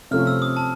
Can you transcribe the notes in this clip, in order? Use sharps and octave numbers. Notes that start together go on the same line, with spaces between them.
C3 F3 A3 C#4 F6
E6
D#6
A5